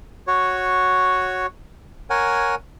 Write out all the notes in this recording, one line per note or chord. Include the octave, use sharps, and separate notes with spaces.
F#4 C#5
A#4 C#5 F#5 G#5